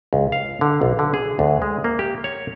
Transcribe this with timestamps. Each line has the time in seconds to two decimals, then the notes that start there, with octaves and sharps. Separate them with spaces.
0.13 C#2
0.32 F5
0.61 D3
0.81 B1
0.99 D3
1.14 G#4
1.39 D2
1.62 G#3
1.84 A#3
1.99 G4
2.24 C#5